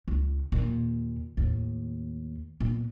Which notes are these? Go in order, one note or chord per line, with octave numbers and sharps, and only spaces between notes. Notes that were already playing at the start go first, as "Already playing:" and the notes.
C#2
D#2 A#2
D#2 A2
A#2 B3